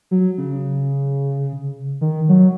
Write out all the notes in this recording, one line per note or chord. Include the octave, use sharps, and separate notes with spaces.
F#3
C#3
D#3
F#3